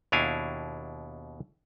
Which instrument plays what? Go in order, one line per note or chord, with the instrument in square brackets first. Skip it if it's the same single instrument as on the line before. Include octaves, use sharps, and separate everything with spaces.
[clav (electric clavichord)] D#2 B2 D4 E4 F5 G#5